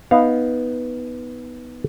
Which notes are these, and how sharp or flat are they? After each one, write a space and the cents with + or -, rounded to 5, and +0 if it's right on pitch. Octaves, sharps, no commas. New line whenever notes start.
B3 +0 D#4 +15 F5 +0